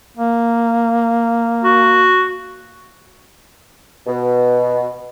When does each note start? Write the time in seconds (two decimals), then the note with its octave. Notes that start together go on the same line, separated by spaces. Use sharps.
0.17 A#3
1.64 F#4
4.07 B2